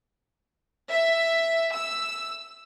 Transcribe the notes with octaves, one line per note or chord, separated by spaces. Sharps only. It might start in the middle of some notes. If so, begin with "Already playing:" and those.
E5
E6